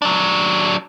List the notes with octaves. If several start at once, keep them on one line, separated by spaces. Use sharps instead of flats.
F#3 D4